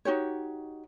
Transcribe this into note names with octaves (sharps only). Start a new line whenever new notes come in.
D#4 F#4 G4 C#5